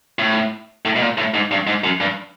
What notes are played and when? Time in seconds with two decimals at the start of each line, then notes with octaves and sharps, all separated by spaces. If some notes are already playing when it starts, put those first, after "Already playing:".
0.19 A2
0.85 A2
0.96 B2
1.02 A#2
1.17 A2
1.34 G#2
1.51 G2
1.67 G#2
1.84 F#2
2.00 G2